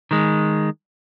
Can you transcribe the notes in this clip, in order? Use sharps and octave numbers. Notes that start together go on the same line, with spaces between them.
D#3 G#3